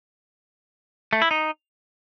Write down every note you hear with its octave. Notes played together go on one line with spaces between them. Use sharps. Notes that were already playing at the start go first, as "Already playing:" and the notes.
A3
E4
D#4